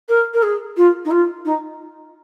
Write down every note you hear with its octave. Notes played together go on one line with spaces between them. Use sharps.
A#4
A#4
G#4
F4
D#4
F4
D#4